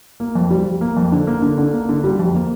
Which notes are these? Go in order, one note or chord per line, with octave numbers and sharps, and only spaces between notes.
A#3
F2
G3
F2
A#3
F2
D3
A#3
D3
D3
A#3
D3
G3
F2
A#3